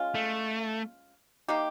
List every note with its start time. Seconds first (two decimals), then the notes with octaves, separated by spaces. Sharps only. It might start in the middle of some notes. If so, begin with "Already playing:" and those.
Already playing: G#3 C#4 F4
0.15 A3
1.48 A#3 D#4 G4